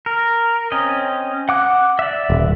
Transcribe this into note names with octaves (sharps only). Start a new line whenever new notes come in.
A#4
C4 C#4 D#5
F#5 D6 F#6
D5 E5
D#1